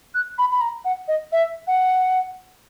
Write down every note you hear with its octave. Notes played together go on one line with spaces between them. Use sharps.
F#6
B5
B5
A#5
F#5
D#5
E5
F#5